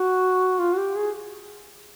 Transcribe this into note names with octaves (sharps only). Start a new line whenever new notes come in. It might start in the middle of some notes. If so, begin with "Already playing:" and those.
Already playing: F#4
F4
F#4
G4
G#4